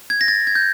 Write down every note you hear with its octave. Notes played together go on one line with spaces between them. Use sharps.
G#6
A#6
A6
G#6
G6